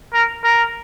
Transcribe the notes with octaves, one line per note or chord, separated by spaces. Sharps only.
A#4
A#4